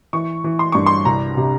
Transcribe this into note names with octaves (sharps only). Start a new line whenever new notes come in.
E3 C#6
E3
C6
G2 C#6
C6
C2 A#5
C3